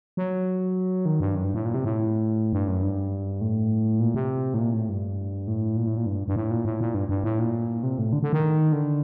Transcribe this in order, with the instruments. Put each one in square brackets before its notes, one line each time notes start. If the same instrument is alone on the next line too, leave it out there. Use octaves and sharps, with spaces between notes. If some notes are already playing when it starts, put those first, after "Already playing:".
[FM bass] F#3
D#3
G2
F#2
G2
A2
A#2
C3
A2
G2
F#2
G2
A2
A#2
C3
A2
A#2
A2
G2
A2
A#2
A2
A#2
G2
G2
A2
A#2
A2
A#2
G2
G2
A2
A#2
C3
A2
D3
D3
D#3
D3